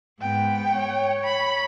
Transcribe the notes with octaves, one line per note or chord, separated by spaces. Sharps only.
G#2 B3 G5
C#5
B5